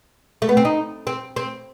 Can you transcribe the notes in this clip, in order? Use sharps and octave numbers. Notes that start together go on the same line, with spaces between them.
A3
B3
C4
D#4
C4
C4